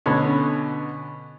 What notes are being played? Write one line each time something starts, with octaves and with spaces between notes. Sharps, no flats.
B2 D3 C#4